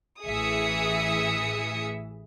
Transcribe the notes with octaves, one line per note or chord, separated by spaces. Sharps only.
A1 E3 G#4 E5 D#6 C#7